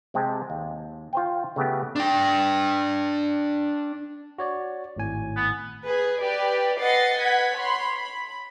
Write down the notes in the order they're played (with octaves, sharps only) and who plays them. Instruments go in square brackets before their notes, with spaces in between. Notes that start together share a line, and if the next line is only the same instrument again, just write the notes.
[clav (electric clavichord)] C3 G#3 C4 G4 A5
D#2
F4 C5 G5
C#3 A3 B3 G4
[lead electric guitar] D4 G5
[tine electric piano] F#4 C#5 D5
G#1 A2 G#5
[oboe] B3
[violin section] G#4 B4
G4 B4 D5
B4 D#5 F#5 A6 C7 C#7
B4 F#5 G#6 B6
C#5 B5 C6
B5